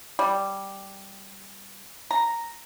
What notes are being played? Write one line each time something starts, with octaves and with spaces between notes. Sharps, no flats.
G3
A#5